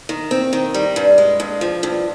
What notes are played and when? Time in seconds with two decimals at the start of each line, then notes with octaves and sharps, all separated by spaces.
0.09 D#3
0.31 C4
0.53 D#3
0.74 G3
0.96 G2
1.18 G#3
1.40 G2
1.61 F3
1.83 G2